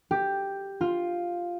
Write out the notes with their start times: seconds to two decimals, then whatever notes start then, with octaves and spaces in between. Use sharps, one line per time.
0.11 G4
0.81 F4